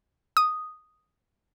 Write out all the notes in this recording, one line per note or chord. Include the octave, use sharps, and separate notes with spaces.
D#6